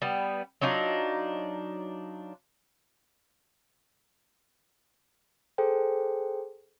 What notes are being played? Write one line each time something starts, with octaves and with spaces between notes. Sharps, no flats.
G3 B3
F#3 D4 D#4 F4
G#4 A4 C5 G5